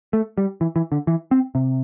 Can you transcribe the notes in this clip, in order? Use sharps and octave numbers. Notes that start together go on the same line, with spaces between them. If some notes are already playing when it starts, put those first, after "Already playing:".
A3
G3
E3
E3
D3
E3
C4
C3